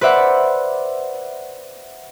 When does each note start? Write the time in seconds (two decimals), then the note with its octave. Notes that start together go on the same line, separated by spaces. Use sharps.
0.01 B4 C5 D5 E5 F#5